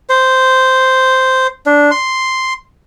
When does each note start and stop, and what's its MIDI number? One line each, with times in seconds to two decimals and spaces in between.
0.09 1.47 72
1.66 1.91 62
1.91 2.54 84